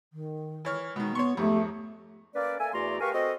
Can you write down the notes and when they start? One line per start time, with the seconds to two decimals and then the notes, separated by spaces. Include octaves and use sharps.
0.13 D#3
0.65 E3 C#5 F6
0.96 B2 D#3 G#3
1.15 B3 C#5 C6 C#6
1.37 F2 G#2 A3 G4
2.35 A#3 C#4 B4 D5
2.59 A#3 A4 E5 G#5
2.73 E2 A3 F#4 D5 A#5 C6
3.00 G4 A#4 B4 F5 G#5 C#6
3.13 C4 F#4 A4 D#5